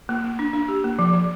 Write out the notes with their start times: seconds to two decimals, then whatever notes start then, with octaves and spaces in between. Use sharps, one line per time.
0.09 A#3
0.24 A#3
0.39 D4
0.53 D4
0.68 G4
0.84 A#3
0.99 F3
1.14 F3